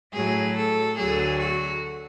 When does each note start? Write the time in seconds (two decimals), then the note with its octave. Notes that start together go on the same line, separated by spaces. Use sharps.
0.13 A2 F#3 G#4
0.55 A4
0.97 D2 D3 F#3 G#4
1.39 F#4